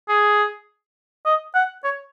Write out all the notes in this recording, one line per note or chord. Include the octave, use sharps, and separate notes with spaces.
G#4
D#5
F#5
C#5